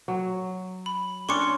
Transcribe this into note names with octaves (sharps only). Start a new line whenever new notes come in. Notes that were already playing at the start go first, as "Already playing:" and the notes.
F#3
B5
C#4 D4 C#5 C6 C#6 C#7